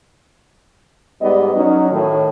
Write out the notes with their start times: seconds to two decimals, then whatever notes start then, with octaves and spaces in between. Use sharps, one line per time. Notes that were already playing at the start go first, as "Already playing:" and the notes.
1.22 G#2 G3 B3 D5 D#5
1.55 F#3 C#4 D#4
1.91 A2 D#3